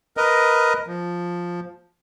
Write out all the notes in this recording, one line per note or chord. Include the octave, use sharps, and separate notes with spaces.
A#4 B4 D#5
F3